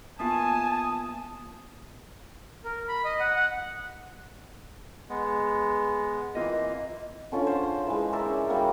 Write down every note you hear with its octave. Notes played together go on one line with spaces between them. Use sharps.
A#3 B3 F4 G#5 A5 D#6
A#4
B5
D#5
F#5
F#5
G#3 B3
E3 A#3 C4 F4 D#5
D3 C#4 F4
C5
E3 G#3
A#4 C5 D5 E5
C#4
G3 A#3 F#4 G4